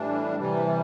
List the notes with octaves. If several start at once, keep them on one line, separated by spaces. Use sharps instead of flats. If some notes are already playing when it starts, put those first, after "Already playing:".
Already playing: A2 E3 G3 D4
C3 E3 G3